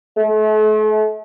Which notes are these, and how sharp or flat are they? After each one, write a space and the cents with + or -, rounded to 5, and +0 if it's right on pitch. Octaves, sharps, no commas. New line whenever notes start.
A3 -40